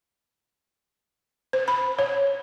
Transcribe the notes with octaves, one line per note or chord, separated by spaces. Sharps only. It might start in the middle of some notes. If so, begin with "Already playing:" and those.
C5
B5
C#5